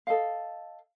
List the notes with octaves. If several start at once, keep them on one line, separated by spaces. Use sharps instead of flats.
A4 D#5 F5